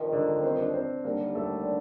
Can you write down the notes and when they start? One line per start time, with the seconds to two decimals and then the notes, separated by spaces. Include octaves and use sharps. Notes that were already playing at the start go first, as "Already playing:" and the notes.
Already playing: G1 F2 D#3
0.12 D3 D4
0.43 C4 C5
0.58 D4 D5
0.74 C4 C5
1.04 D#2 D3 G3 A#3 D4 A#4
1.35 A3 A4